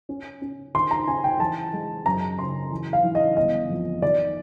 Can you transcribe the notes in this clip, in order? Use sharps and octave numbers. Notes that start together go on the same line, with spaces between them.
C#4
C#4
D#3 C6
A#5
C#4 G#5
G5
E3 A5
G#3
F#2 A#5
C#3 C6
E3
F5
E3
D#5
G1 D#5
F2
D#3 D5